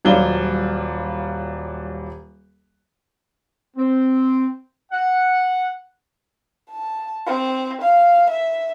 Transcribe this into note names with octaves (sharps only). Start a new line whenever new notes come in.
D#1 F#3 G3 F4 G7
C4
F#5
A5
C4
F5
E5